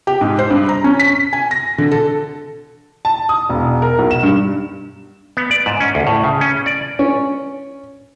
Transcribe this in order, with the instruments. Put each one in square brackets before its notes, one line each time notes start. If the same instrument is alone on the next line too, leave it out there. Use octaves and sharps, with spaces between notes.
[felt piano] G4
G#2
C5
G2
A#5
C#4
B6
G#5
A#6
D3
A4
[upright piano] A5
D#6
E1
A#4
B1
E7
G2
[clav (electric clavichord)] B3
D5
G#2
C#4
D2
A2
C#3
C#4
D5
[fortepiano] C#4